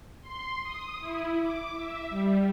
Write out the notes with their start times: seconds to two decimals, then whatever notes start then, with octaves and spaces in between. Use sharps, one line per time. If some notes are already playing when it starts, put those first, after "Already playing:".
0.21 C6
0.63 D#6
0.99 E4
1.41 D6
1.72 E5
2.09 G3